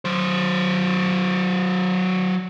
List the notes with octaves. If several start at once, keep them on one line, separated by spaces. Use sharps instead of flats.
F#3 C5